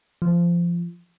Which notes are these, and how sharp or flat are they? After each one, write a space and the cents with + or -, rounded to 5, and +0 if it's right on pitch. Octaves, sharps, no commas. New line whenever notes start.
F3 -20